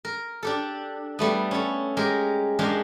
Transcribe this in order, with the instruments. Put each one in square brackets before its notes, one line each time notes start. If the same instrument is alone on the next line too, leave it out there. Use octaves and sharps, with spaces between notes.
[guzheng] A#4
D4 G4 A4
G3 A3 B3
C#4 A4
G#3 G4 A#4
F#2 G#3 D4 G4 F5